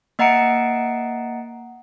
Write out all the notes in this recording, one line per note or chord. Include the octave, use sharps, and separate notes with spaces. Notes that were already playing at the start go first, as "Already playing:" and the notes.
A#3 D#5 F#5 A#5 C#7 D7